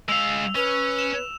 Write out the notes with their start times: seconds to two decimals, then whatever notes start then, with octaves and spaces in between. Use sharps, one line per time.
0.08 G#3 F5 E6 F7
0.56 C#4 B4
0.99 E7